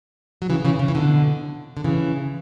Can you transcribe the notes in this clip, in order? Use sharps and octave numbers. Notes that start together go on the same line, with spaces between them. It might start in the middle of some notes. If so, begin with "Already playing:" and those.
F#3
C#3 E3
C#3 E3
C#3
E3
B2 D3
D3
C#3 E3